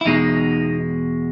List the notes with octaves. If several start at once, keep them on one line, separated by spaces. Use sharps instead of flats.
E4
E2 B2 G#3 D#4